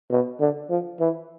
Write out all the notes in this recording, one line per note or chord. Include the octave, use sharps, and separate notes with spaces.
B2
D3
F3
E3